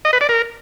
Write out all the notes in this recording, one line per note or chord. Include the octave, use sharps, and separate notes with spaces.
D#5
B4
D5
A#4